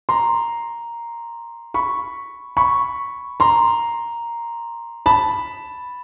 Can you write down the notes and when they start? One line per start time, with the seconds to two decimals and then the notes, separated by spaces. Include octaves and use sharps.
0.09 A#5 C6
1.74 B5 C#6
2.57 B5 C#6
3.40 A#5 C6
5.06 A5 B5